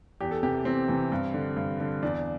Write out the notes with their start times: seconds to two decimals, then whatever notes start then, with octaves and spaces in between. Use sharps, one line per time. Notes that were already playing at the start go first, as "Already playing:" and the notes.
0.21 E2 G4
0.31 A4
0.43 C3 E3 G4
0.65 E2 C4
0.88 C3 E3
1.12 G2
1.34 D3
1.56 G2
1.80 D3
2.03 E2 D4